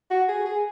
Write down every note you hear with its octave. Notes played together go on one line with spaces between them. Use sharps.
F#4
G#4
G#4